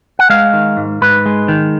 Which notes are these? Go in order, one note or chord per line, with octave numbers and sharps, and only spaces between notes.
F#5
G#3 F5
D#3
G#2
G#2 B4
G#3
D#3